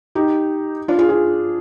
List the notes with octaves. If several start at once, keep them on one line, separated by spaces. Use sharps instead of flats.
D#4 G4
D4 F4
F4 G#4
F4 G#4